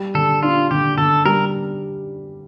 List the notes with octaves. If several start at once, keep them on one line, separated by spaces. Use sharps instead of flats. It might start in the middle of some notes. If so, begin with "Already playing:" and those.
Already playing: G3
D3 A4
D4 F4
D3 G4
D3 A4
G3 A#4